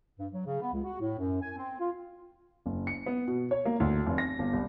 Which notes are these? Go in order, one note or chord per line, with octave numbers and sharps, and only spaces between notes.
G2
F#3
C#3
B3
C#2
F#4
A2
F#2
G#5
C4
F4
F#1
C#7
B3
B2
C#5
A#3
D2
F1
A#6
G1
C2